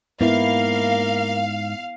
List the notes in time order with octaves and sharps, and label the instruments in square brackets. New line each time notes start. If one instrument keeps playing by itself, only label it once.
[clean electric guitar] G#2 [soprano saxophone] A#3 [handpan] B3 E4 [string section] F5